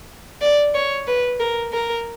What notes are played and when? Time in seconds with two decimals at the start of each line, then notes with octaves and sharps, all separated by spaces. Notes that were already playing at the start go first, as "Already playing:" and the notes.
0.41 D5
0.75 C#5
1.07 B4
1.40 A#4
1.73 A#4